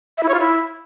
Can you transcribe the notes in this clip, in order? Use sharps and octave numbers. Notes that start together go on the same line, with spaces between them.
E5
E4
C#5
F4
E4